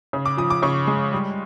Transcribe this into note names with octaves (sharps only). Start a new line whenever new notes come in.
C#3
D6
F3 D#6
D6
C#3 C#6
G#3
G3